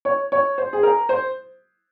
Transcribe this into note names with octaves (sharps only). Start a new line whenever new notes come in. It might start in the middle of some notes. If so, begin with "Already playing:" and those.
C#5
C#5
C5
G#4
A#4
C5